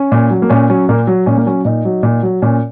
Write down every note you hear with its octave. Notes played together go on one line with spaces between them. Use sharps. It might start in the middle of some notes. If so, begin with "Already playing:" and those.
Already playing: C#4
A#2
F#3
A#3
A#2 C#4
F#3 C#4
A#2 A#3
F#3
A#2 C#4
A#3
F#3 C#4
A#2 D#4
F#3
A#2
F#3
A#2 C#4